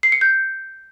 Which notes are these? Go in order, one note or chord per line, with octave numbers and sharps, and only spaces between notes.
C7
C#7
G6